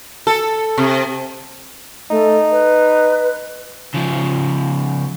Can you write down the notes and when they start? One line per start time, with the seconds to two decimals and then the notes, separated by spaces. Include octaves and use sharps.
0.27 A4
0.78 C3
2.10 A3 D#4
2.52 B4
3.94 C#3 F3